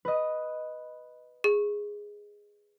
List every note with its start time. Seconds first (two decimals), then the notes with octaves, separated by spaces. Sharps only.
0.05 B4 D#5
1.44 G#4